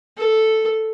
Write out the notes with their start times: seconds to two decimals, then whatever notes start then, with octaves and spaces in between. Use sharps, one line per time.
0.18 A4